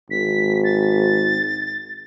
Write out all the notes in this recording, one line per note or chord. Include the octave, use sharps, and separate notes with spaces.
G#1 B6
A6